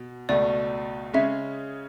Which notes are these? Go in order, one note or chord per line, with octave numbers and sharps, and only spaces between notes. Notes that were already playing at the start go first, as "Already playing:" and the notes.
Already playing: B2
C#2 B2 A3 D5
C#3 G#3 C#4 E5